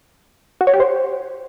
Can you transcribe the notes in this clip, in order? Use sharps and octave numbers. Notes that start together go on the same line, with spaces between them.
F#4
C#5
G4
C5